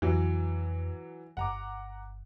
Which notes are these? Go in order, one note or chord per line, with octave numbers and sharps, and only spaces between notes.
F2 E3 F#3
G1 F#5 A#5 D6